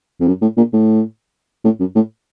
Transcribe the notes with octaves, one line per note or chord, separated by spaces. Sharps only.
F2
F#2
A2
A#2
A2
A2
F#2
A2